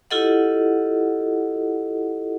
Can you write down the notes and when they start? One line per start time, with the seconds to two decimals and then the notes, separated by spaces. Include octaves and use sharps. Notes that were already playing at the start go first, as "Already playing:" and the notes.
0.11 E4 F4 G4 A4 D#5 F#5